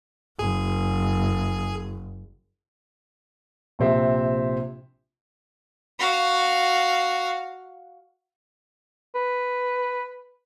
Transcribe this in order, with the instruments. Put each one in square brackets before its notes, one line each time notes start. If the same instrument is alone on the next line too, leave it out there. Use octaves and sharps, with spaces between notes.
[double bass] F#1 [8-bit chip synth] G#4
[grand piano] A#1 C3 C4 E5
[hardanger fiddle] F#4 F5
[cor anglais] B4